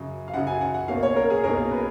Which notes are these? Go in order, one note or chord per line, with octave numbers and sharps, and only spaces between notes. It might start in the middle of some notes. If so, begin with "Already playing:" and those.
Already playing: F#2 C#3 F#3
F5
F#2 C#3 F#3 F#5
G#5
F#5
F#5
B1 B2 A#3 C#4 F5
C#5
A#4
G#4
B1 B2 A#3 C#4 A#4
B4